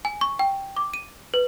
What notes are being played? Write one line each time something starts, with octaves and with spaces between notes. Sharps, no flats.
G#5
C#6
G5
D6
D#7
B4